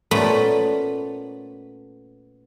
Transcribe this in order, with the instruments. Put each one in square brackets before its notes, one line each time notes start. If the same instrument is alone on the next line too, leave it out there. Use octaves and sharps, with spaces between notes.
[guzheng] A#2 A3 B3 C#4 B5